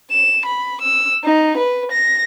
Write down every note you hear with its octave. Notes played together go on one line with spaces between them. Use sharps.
E7
B5
E6
D#4
B4
A#6